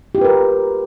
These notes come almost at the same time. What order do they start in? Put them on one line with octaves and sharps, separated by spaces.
G4 F4 B4 A#4